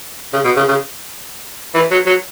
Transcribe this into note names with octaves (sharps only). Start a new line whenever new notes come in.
C#3
B2
C#3
C#3
E3
F#3
F#3